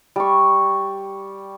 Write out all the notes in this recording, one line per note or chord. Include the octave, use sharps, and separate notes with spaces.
G3 C#6